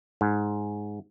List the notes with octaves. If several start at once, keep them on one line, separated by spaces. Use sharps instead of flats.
G#2